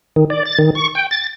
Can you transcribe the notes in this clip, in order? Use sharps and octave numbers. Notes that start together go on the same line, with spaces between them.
D#3
D5
A6
D#3
C#6
G5
A6